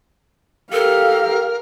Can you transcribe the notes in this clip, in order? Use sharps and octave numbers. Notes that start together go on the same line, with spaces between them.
G4 A4 A#4 F5